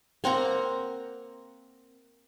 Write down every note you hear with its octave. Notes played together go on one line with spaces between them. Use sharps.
A#3 C4 F#5 A#5